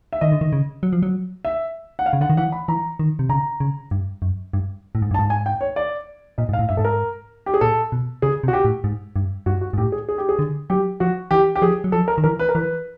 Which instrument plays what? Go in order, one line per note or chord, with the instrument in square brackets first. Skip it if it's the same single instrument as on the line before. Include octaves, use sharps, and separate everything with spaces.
[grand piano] E5
[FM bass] D#3 [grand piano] D#5
[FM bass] D3
D#3
C#3
F#3
F3
F#3
[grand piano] E5
F#5
F5
[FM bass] C#3
[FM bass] D3 [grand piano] F#5
[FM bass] D#3
[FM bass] E3 [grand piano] F#5
[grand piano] B5
[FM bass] E3 [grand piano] A#5
[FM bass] D#3
C3
[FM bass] C#3 [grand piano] A#5
[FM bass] C#3
G2
F#2
G2
A2
G#2
[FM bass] G2 [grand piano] A5
[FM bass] G#2
[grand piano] G#5
G5
C#5
D5
[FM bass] A#2 [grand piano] D#5
[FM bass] G#2
[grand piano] F5
[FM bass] A2
[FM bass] G2 [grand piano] E5
[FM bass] G#2 [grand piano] A4
[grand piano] A#4
G4
G#4
[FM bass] A#2 [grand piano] A4
[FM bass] B2
[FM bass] C#3 [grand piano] G#4
[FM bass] C3
[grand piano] F#4
G4
[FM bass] A2
G#2
G2
[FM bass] G2 [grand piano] F#4
[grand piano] F#4
[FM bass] G#2
[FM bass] A2 [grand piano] G4
[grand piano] G#4
G#4
G4
G#4
[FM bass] D3
[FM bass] F#3 [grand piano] G4
[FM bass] F3 [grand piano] F#4
[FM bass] E3 [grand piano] G4
[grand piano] G4
[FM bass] F3 [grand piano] G#4
[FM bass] F#3
[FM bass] F3 [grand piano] A4
[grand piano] A#4
[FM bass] D#3
[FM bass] E3 [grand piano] A#4
[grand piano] B4
A#4
[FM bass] E3 [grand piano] B4